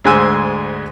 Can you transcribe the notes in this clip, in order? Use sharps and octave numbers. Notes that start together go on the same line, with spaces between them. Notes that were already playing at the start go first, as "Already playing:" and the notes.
D2 G#2 G#3 C5 G#5 E6